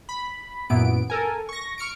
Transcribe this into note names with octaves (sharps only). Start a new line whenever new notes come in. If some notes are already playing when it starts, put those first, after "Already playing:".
B5
F#2 A#2 E3 B3 D7
A4 A#4 G#5
C#6 A#6
C#6 F6 C#7 D7